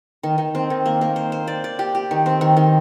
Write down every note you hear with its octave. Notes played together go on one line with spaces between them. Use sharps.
D#3
D#3
C4
D#3
A#3
A#3
C5
C5
D5
D5
G4
G4
D#3
C4
D#3
D#3